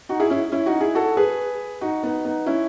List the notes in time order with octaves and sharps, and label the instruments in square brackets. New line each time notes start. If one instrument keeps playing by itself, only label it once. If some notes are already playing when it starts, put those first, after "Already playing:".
[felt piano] D#4 F#4
E4 G#4
C#4 E4
C#4 E4
D#4 F#4
E4 G#4
F#4 A4
G#4 B4
D#4 F#4
B3 D#4
B3 D#4
C#4 E4